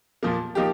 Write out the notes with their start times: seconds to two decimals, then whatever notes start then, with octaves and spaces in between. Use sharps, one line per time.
0.23 A#2 F3 A#3
0.55 F3 A#3 D#4 G4